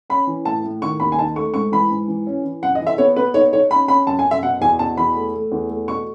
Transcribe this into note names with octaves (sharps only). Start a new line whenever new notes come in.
C#4 B5
E3
A2 A5
A2
D#3 C#6
D#2 B5
G#5
D#4 A5
A3 C#6
G#2 C#6
E3 B5
G#2
E3
C#4
E3
F#2 F#5
D#5
E3
E5
B3 C#5
B3 B4
D#4 C#5
D#4 C#5
C#4 B5
C#4 B5
F#2 A5
G#5
F#2
E5
B2 F#5
E2 G#5
B2 A5
E2 B5
A3
A3
E2
A3
B2 C#6